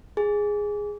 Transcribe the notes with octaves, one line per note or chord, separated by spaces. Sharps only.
G#4